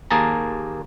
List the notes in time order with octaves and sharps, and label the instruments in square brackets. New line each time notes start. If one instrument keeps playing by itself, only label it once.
[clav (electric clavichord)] D#2 A#3 G#4 A5 A#5